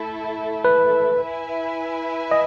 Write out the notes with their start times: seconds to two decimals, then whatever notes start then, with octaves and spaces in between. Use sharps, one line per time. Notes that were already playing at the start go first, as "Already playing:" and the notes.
Already playing: A3 E4 A4
0.65 B4
1.20 E4 B4 E5 G#5
2.31 D#5